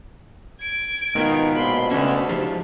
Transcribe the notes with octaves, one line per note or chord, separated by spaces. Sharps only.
G#6 D7
G#2 B2 D#3 B3 F4
A#1 B2 B5 C6
D2 C#3 C#4 A4
G#2 F3 F4 G4